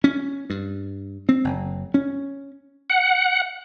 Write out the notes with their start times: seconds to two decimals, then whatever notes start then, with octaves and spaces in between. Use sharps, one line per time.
0.04 C#4
0.50 G2
1.29 C4
1.44 F#1
1.94 C#4
2.90 F#5